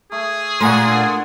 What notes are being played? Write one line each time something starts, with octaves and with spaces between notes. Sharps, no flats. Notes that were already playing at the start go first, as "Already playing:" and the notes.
A3 G#4
A#2 A3 A#4 C#5 D5 F#5 G#5 C6
D4 A4